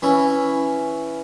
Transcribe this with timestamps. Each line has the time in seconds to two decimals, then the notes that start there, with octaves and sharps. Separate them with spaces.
0.02 E3 C#4 E4